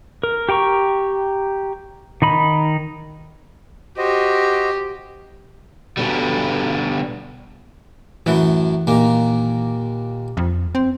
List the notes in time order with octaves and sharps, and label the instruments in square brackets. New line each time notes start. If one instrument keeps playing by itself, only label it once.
[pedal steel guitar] A#4
G4 G5 A#5 C#6
D#3 D#4 B5
[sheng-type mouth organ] F#4 C5 D#5 [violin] G4
[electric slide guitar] B2 D3 G3
[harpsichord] F#2 A2 F#3 [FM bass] E3
[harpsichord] D#2 A#2 A#3
[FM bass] F2
C4